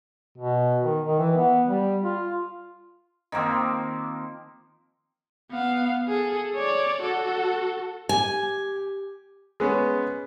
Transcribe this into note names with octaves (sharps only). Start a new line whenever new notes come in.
B2
D#3
D#3
E3
B3
G3
F4
D#3 F3 A#3 C4
B3 F5
G#4 A4
C#5 D5
F#4 A4
G4 G#5
G#3 B3 C#4